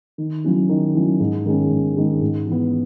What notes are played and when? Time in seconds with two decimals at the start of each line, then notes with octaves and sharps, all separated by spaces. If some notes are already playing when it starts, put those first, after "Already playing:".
0.18 D#3
0.44 F#3 C#4 E4
0.69 D#3
0.94 F#3 C#4 E4
1.20 G#2
1.46 D#3 G#3 C#4
1.71 G#2
1.96 D#3 G#3 C#4
2.21 G#2
2.47 E3 B3